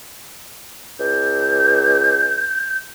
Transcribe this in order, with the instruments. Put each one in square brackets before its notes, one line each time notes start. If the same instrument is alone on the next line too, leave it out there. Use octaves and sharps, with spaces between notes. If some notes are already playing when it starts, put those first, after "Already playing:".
[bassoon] C#2 [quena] G6